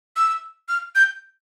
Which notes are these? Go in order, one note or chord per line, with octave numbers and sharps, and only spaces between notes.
E6
F6
G6